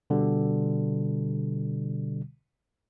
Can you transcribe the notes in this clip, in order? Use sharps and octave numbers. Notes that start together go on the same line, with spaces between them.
B2 D3 G3